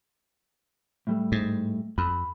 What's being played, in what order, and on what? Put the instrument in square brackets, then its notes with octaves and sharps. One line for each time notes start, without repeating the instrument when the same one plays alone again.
[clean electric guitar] A2 G3 A3
[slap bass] G#2
[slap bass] F2 [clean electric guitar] B5